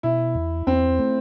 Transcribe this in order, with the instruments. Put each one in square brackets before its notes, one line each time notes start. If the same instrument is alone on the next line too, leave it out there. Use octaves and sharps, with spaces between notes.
[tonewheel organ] B2 [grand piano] E4
[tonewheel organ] E2
[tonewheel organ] E2 [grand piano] C4
[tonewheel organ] A3